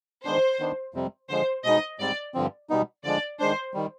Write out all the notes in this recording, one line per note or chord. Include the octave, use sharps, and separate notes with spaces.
D#3 G#3 B3 D4 C5
D#3 B3 D4
F2 C3 G3 C4
D3 F3 G#3 C5
B2 G#3 B3 D#4 D#5
G#2 G3 C4 D5
G2 D3 F3 C4
B2 G3 B3 D#4
D3 F3 G#3 D4 D5
D#3 G#3 D4 C5
D#3 G3